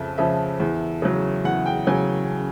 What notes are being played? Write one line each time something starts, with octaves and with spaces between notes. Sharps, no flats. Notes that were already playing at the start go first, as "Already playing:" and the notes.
Already playing: F2 C#3 F3 E5
C#3 F3 E5
E2
C#3 F#3
E2 F#5
G5
C#3 F#3 G#5